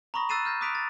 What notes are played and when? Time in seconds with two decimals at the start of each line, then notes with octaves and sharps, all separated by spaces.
0.14 A#5 B5 C#6 D#6 A#6
0.29 E6 F#6 A6 C7 D#7 E7
0.45 F6 G6 A#6
0.61 D6 D#6 F#6 B6 D7 F7
0.75 A6